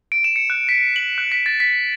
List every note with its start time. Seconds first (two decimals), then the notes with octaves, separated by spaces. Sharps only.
0.12 D7
0.24 E7
0.36 C#7
0.50 F#6
0.69 B6
0.96 F#7
1.18 F#6
1.32 B6
1.46 A6
1.60 B6